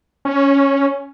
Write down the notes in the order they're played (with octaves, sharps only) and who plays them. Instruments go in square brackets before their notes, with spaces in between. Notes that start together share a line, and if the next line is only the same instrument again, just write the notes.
[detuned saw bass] C#4